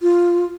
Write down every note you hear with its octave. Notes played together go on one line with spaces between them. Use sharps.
F4